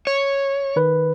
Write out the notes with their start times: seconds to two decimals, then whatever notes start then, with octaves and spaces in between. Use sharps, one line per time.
0.07 C#5
0.76 D#3 B4